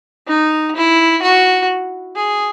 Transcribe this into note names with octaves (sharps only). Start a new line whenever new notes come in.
D#4
E4
F#4
G#4